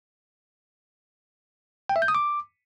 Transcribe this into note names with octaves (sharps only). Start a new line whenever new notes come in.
G5
E5
G6
D#6
D6